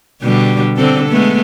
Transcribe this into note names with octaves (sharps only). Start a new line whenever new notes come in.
B2 D3 G3
D3 C4 A4
G#3 A3 B3